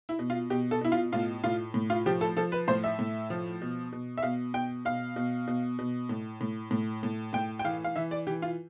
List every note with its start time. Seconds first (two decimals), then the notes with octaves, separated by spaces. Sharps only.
0.09 E4
0.19 B2
0.30 F4
0.50 B2 G4
0.71 A4
0.81 B2 E4
0.92 F4
1.13 A2 F4
1.44 A2 F4
1.74 A2
1.90 F4
2.06 F3 G4
2.21 A4
2.36 F3 A4
2.52 B4
2.68 A2 C5
2.84 E5
2.99 A2
3.30 F3
3.61 B2
3.92 B2
4.18 E5
4.23 B2 F5
4.54 B2 G5
4.85 B2 F5
5.16 B2
5.47 B2
5.79 B2
6.09 A2
6.41 A2
6.71 A2
7.03 A2
7.33 A2 G5
7.59 G5
7.64 E3 F5
7.84 F5
7.96 E3 E5
8.11 D5
8.27 E3 G4
8.42 F4